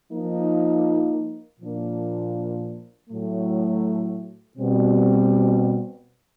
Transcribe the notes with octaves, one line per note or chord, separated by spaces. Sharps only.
F3 A#3 D#4
A#2 F3 A#3 D4
A2 F#3 A3
B2 G3 C4